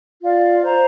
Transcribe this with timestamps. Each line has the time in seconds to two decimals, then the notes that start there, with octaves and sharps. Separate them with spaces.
0.22 F4 D5 F5
0.63 C5 A#5